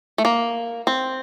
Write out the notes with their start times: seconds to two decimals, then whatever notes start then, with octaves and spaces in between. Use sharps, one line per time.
0.18 A3
0.25 A#3
0.87 C4